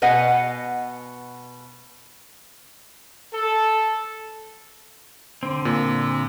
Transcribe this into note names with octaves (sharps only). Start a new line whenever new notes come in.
B2 B4 D#5 F#5 G#5
A4
D3 C4
A#2